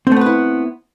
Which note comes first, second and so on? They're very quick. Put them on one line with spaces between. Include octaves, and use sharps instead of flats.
C4 A3 B3 B4 E4